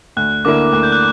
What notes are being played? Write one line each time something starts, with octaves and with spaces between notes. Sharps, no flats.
D2 F#6
D3 A#3 E4 A#4 D6
D2 F#6
G6
F#6